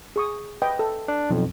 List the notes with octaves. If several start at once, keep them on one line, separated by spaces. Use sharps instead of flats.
G#4 C#6 D#6
B4 D#5 G5
A4
D4
B1 F2